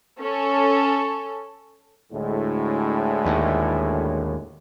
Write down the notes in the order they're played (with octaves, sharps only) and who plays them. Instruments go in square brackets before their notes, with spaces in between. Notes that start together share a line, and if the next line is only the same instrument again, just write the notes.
[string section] C#4 A4
[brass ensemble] D2 A2 G#3
[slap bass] D#2